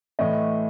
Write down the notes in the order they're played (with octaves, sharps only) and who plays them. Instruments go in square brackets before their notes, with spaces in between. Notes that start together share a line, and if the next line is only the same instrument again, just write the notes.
[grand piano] A2 E3 A3 D#5